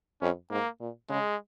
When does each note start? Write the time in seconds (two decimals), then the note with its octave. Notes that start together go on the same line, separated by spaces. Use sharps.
0.21 F2 C#4
0.50 G#2 A#3
0.80 A#2
1.09 C#3 G#3